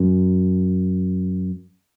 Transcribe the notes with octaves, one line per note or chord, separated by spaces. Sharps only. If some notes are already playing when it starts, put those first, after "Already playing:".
Already playing: F#2